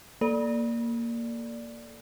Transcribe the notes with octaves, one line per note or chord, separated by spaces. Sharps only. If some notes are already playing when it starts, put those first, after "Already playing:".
A#3 A4 D5